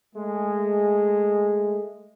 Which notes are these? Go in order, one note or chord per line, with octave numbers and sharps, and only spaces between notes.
G#3 A3